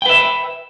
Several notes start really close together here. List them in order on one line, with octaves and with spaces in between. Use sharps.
G5 B4 E5